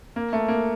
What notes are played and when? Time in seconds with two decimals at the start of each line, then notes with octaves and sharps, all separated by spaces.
0.16 A#3
0.33 A3
0.48 A#3